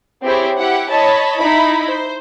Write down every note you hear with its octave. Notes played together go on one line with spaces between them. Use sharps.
C4 E4 G4 G#4 C5 C#5
E4 G4 F#5
C#5 D#5 A5 B5
D#4 E4 B5
C5